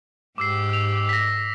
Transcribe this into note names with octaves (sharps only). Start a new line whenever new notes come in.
G#2 G4 D6 E6 C7
E6 F7
A#6 B6